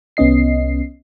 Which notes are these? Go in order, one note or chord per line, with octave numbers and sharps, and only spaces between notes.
C2 B3 C#4 D#5 C7